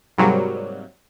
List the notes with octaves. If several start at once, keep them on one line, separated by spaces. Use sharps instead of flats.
G#2 C3 F#3 G3 A#3